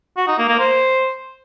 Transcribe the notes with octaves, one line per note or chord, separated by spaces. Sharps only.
F#4
D#4
A#3
A#3
C5